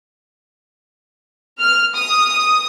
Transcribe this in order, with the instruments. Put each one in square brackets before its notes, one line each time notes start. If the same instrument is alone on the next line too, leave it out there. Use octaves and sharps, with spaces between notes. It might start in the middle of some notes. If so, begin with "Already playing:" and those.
[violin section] F6
D#6